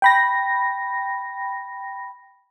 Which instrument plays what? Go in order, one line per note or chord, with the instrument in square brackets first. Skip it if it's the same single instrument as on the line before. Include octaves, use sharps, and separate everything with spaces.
[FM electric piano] G5 B5 A#6